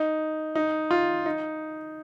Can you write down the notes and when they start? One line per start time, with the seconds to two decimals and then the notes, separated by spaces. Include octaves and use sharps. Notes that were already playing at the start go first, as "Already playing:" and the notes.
Already playing: D#4
0.55 D#4
0.91 F4
1.26 D#4